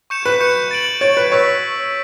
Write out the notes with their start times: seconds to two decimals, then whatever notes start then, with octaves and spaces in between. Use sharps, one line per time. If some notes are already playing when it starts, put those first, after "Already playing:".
0.10 C#6 G6 C#7 E7
0.26 B4
0.40 C#6 G6 C#7 E7
0.71 A6 D7 F#7
1.01 C#5 A6 D7 F#7
1.17 B4
1.32 C#5 C#6 E6 B6